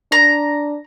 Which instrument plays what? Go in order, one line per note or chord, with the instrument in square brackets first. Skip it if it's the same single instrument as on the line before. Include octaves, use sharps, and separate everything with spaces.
[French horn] D4 [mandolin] A#5